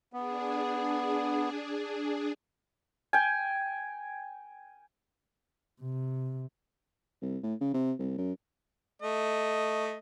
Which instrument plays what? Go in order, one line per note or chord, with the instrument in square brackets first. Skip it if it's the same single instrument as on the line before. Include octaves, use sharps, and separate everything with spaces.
[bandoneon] B3 [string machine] D4 G#4
[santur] G5 G#5
[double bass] C3
[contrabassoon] C2
A2
C#3
C3
C2
F#2
[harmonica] A3 D#5